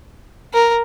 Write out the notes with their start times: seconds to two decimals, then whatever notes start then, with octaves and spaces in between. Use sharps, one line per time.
0.54 A#4